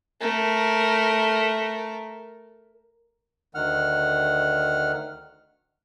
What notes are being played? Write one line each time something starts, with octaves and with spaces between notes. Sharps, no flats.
A3 A#4
D2 D#3 F#5 F6